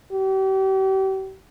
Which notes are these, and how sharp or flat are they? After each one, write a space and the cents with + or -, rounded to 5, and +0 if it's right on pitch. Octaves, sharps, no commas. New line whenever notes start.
G4 -40